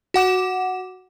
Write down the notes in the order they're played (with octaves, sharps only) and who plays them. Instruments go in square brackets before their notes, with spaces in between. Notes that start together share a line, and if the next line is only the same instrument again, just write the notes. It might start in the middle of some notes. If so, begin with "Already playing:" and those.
[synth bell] F#4 F#5 D6 E7